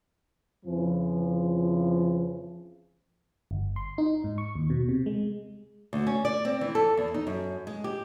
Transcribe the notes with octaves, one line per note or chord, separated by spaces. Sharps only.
F2 C#3 E3 F3
G1
C6
D#4
G#2
C#6
D#2
B2
C3
G#3
D2
C#4
D5
C4
E3
A4
E2
D#4
F#2
G#3
G4